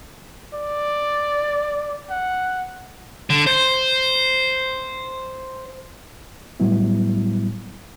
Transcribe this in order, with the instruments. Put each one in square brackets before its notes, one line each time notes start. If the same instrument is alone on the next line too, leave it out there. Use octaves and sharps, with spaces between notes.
[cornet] D5
F#5
[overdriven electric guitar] D3
C5
[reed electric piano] A2 F#3 G3 B3 E4